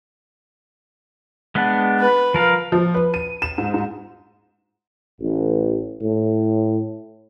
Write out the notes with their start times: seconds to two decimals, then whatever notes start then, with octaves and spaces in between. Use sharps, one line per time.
1.55 G#3 B3 D4
2.00 B4
2.34 F3 A#4 F5
2.72 F3
2.94 B4
3.14 D#7
3.42 E7
3.58 G#2
3.74 G#2
5.21 A1
6.02 A2